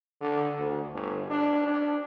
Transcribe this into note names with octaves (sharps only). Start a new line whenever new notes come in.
D3
D2
G1
D4
D4